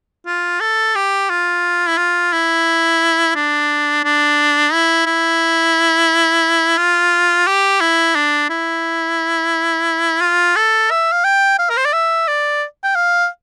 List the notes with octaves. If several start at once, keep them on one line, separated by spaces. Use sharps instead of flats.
F4
A4
G4
F4
E4
F4
E4
D4
D4
E4
E4
F4
G4
E4
D4
E4
F4
A4
E5
F5
G5
F5
A#4
C5
D5
E5
D5
G5
F5